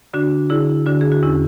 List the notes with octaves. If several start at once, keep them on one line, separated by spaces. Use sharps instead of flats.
D3 D4 F#4
D3 E4 G#4
D3 D4 F#4
G#4
F#4
E2 C#4 E4